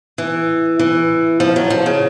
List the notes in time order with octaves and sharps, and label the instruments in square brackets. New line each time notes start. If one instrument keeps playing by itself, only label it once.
[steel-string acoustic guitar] E3
E3
F3
F#3
F3
C#3